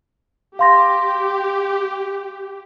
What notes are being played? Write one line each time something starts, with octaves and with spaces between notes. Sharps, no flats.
G4 F5 C6 A#6